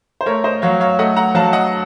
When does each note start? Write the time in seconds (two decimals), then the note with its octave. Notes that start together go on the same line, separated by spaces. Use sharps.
0.21 C5
0.26 A3 A#4 C#5
0.44 C5 D#5
0.62 F#3 C#5 F5
0.80 C#5 F5
0.99 A3 D#5 F#5
1.16 F#5 A#5
1.35 F#3 F5 A5
1.53 D#5 F#5